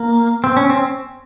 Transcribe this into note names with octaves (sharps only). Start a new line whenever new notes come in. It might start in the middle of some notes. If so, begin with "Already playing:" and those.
Already playing: A#3
C4
C#4
C4